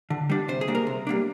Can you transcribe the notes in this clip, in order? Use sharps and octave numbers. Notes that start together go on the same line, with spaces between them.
D3
G3 D4
C3 C5
G#4
G3 A#3 D4
A#4
C3
G3 A#3 D4